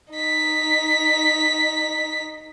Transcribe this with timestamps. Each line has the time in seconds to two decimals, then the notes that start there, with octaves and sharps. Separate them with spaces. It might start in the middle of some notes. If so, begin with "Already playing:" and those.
0.13 D#4 B6